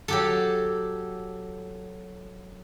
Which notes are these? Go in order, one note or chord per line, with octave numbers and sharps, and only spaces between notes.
F#3 G4 A4